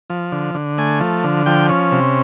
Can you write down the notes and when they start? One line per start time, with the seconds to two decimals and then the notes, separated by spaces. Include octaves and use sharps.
0.10 F3
0.32 D3
0.55 D3
0.78 A3 G#5
1.00 F3
1.24 D3
1.46 F3 G5
1.69 C#4
1.92 C3